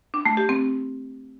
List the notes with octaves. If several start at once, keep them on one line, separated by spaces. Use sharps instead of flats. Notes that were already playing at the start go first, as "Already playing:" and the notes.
D4
A3
G4
C4